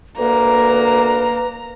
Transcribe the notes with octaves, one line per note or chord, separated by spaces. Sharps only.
D2 A#3 B4 A#5